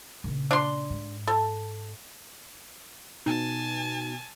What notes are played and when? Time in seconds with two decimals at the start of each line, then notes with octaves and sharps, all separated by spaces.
0.24 A#1 C#3
0.51 D4 C6
0.90 G#2
1.27 A4
3.26 B2 D#4 G#5 A5